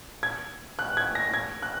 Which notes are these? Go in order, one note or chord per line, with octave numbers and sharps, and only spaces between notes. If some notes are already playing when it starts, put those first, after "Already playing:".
G#6
F#6
G#6
A#6
G#6
F#6